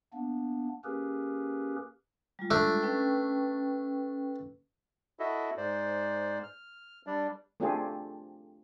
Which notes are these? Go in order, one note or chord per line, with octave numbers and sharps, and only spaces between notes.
A#3 B3 D4
A#3 C#4 G4 G#4 A#4 B4
G3 G#3 F4
A3 D4
C#4 B4 G5
E4 F#4 A4 D#5 E5
G#2 C5 D5
F6
G3 D4 D5
A3 C4 D4 F4 G4 G#4